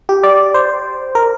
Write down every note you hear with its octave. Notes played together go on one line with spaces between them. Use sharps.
G4
D5
C5
A#4